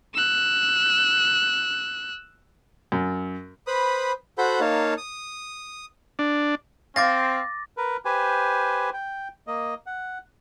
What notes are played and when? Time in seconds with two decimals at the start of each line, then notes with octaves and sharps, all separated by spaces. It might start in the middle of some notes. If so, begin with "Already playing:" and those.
0.14 E6 F#6
2.92 F#2
3.66 B4 C5 B5 D#6
4.38 F#4 A4 C5 F#5 B5 G6
4.60 A#3 D#4 C#5 F5 A5
4.98 D#6
6.19 D4
6.96 C4 F5 D6 A6 A#6
7.77 A#4 B4
8.05 G4 B4 C5 G#5
8.94 G5
9.47 A#3 D#5
9.86 F#5